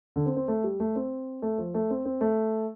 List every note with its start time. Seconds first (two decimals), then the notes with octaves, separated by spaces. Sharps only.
0.16 D3
0.26 C4
0.36 C4
0.48 A3
0.64 G3
0.80 A3
0.96 C4
1.42 A3
1.58 F3
1.74 A3
1.90 C4
2.05 C4
2.21 A3